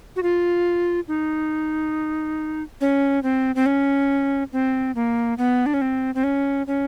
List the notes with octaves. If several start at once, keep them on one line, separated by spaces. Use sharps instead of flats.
F#4
F4
D#4
C#4
C4
C4
C#4
C4
A#3
B3
D4
C#4
C4
C4
C#4
C#4